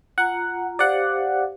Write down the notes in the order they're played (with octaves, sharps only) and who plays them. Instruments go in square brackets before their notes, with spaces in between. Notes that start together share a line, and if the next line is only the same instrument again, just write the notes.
[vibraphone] F4 A#5 [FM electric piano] F#5
[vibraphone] G4 C5 F5 [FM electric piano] D5 F#5